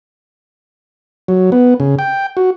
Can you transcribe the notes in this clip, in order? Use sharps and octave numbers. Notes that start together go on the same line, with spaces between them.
F#3
B3
C#3
G5
F#4